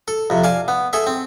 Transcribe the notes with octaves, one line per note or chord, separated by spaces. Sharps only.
A4
F2 C3
D5 F5 G#5 A5
B3
G#4 A4 E5
C4